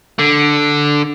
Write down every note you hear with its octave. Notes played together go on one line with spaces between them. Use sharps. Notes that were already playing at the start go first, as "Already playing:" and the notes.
D3